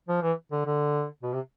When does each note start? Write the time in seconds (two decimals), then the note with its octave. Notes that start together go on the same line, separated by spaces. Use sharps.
0.09 F3
0.22 E3
0.52 D3
0.66 D3
1.23 B2
1.33 C3